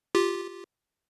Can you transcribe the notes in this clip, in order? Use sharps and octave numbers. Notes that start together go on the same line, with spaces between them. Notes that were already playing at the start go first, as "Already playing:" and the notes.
F4 G4